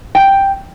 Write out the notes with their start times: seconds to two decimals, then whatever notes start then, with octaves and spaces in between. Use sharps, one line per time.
0.15 G5